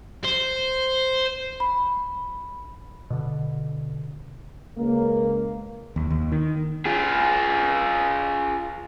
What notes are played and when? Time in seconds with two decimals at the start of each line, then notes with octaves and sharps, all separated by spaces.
0.24 C5
1.60 B5
3.10 B2 D3
4.78 C#2 C#3 A#3
5.96 D#2
6.10 D#2
6.32 D#3
6.86 F4 G#4